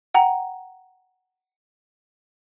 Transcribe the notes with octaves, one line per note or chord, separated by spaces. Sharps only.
F#5 G5 A#5